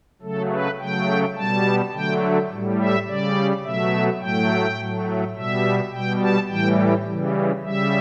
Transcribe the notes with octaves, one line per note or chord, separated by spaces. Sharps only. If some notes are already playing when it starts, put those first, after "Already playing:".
C#3 F#3 A3 A4
B4
C#3 F#3 A3 G5
B2 G3 A5
D3 F#3 A3 G5
A2 G3
E5
C#3 G3 D5
B2 F#3 A3 E5
A2 F#3 A3 G5
A2 F#3 A3
B2 G3 E5
B2 G3 G5
A5
A2 E3 G3 G5
C#3 E3 G3
C#3 G3 E5